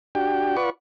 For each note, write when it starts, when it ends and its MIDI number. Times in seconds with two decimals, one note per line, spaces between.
0.15 0.56 62
0.15 0.56 66
0.15 0.56 67
0.15 0.56 79
0.57 0.70 65
0.57 0.70 71
0.57 0.70 74
0.57 0.70 78
0.57 0.70 85